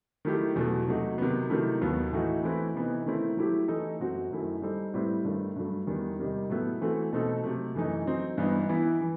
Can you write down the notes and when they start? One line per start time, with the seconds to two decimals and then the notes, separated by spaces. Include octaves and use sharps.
0.25 D#3 F#3 A3 E4 G4
0.56 E2 B2 F#3 A3
0.87 C3 F#3 A3 D#4 F#4
1.18 C3 D#3 F#3 B3
1.50 C3 D#3 F#3 A3 E4
1.81 D#2 D#3 F#3 B3
2.12 A2 E3 A3 D#4 F#4
2.43 E3 A3 C4 E4 B4
2.74 C3 E3 B3 D#4
3.06 D#3 A3 C4 E4
3.37 F#3 A3 E4 G4
3.68 E3 A3 D#4 A4 D#5
4.00 F#2 F#3 C4 F#4
4.31 F#2 D#3 A3 E4
4.62 G3 D#4 A4 C5
4.94 A2 G3 C4 E4 B4
5.25 G2 D#3 A3
5.56 G2 F#3 A3
5.87 E2 D#3 G3 B3
6.19 C3 D#3 G3 D#4
6.49 A2 F#3 B3 E4 A4
6.81 E3 A3 C4 F#4 A4
7.13 B2 A3 C4 D#4 A4
7.43 C3 F#3 A3
7.75 F#2 E3 A3 D#4
8.06 F#3 C4 D#4
8.38 G2 E3 B3 D#4
8.69 E3 B3 E4 B4
9.01 E3